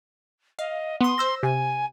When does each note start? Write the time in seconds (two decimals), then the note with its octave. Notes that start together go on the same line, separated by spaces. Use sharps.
0.59 D#5 F5
1.01 B3 C6 D#6
1.18 C5 E6 A#6
1.43 C3 G#5